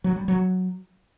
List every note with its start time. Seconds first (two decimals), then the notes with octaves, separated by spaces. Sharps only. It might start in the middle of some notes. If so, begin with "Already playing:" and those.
0.04 F#3
0.16 G3
0.28 F#3